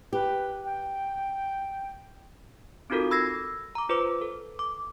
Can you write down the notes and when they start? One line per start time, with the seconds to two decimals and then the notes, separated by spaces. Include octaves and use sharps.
0.13 G4 B4
0.65 G5
2.90 C4 D#4 F4 F#4 A4 A#4
3.11 B5 E6 G#6 A#6 C7
3.75 A#5 D6
3.89 F4 B4 C5 D6
4.22 A4
4.59 D6